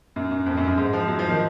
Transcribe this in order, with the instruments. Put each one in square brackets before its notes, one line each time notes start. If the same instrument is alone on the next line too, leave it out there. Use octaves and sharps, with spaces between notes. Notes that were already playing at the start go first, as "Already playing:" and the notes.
[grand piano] F#2
F#2
F2
F#2
F#2
G#2
F3
F#3
F3
D#3